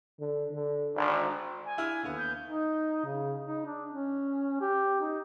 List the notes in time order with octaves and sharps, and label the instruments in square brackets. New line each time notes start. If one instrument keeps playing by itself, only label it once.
[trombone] D3
D3
[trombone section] G#1 [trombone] D4
[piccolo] G#5
[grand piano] D4 E4 F6
D#2 D3 B3
[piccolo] G6
[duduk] D#4
C#3
D#4
D4
C#4
G4
D#4